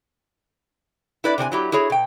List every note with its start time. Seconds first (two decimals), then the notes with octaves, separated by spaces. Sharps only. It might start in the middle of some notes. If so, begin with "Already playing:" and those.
1.24 E4 B4 D5
1.38 C3 C4 C#5 G#5
1.52 F#3 E4 G4
1.72 E4 F#4 G#4 C#5
1.90 B2 G5